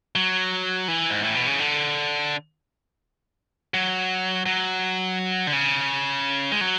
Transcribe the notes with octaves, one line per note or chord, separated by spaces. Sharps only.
F#3
E3
G#2
A2
B2
C#3
D3
F#3
F#3
D3
C#3
G#3
F#3